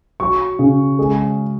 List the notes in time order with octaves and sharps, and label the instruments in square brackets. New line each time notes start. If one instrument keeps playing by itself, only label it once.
[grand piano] F#3 C#6
C#3
G#3